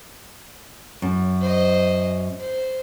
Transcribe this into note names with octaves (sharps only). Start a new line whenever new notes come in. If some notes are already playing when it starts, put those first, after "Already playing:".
F#2
C5 D#5
C5